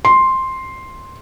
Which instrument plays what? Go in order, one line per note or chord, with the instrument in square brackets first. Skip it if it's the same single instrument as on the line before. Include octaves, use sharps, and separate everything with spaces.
[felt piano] C6